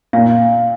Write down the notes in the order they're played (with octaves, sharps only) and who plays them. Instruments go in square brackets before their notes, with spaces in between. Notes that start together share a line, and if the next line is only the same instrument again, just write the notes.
[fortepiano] A#2 [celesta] F5